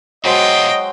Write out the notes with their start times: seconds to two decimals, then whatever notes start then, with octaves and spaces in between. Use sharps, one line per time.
0.25 B2 F#3 G#3 F4 C5 D#5 G5